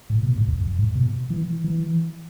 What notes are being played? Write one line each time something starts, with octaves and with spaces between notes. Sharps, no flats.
A2
B2
G#2
E2
F2
G#2
B2
E3
E3